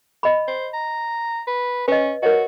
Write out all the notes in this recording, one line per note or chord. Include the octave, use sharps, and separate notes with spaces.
D#5 B5
C5
A#5
B4
C#4 B4 D#5
F#4 A#4 C#5 D#5